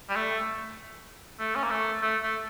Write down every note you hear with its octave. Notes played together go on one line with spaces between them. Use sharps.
G3
A3
A3
C#4
A#3
A3
A3
A3